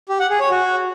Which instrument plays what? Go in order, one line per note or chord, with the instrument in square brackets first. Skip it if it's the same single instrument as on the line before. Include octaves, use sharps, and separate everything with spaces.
[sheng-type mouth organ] G4
F#5
G#4
C#5
F#4